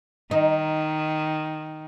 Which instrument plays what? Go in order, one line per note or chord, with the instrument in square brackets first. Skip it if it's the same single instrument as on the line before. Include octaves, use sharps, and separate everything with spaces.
[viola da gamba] D#3 [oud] D#4